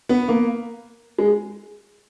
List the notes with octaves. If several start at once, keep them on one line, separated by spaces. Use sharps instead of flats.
B3
A#3
G#3